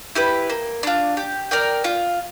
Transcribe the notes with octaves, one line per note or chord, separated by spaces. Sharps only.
E4 G4 B4
A#3
D4 F4
G4
A#4 D5 G5
F4